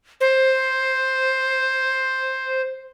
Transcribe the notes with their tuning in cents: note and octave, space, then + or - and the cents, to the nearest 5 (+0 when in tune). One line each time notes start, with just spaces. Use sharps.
C5 +5